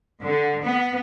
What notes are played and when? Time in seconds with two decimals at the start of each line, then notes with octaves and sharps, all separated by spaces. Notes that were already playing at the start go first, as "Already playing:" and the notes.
0.22 D3
0.63 B3